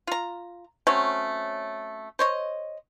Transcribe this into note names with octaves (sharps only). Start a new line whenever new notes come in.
F4 A#5
F#3 A3 C4 C#4
C5 C#5 D#5